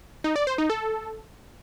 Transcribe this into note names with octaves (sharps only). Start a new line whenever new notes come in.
D#4
D5
C5
D#4
A4